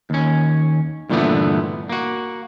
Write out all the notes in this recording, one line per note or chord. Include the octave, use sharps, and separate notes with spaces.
D#2 C#4
G2 A#2 D3 E3 A3 B3
A#3 F#4